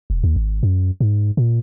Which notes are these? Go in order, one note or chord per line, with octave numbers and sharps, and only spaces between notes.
E1
D#2
G#1
F#2
G#2
A#2